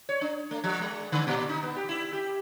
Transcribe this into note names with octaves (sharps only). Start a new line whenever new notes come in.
C#5
D4
A3
F3
G#3
D3
A#2
D#4
B3
G4
E4
G4